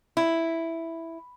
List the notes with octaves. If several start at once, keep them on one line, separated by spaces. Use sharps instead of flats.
E4